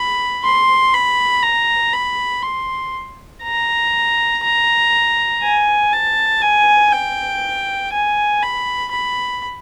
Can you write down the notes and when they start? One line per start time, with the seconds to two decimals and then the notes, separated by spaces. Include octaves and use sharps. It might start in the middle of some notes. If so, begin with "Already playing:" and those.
Already playing: B5
0.44 C6
0.94 B5
1.43 A#5
1.93 B5
2.43 C6
3.44 A#5
4.43 A#5
5.43 G#5
5.93 A5
6.42 G#5
6.92 G5
7.92 G#5
8.42 B5
8.92 B5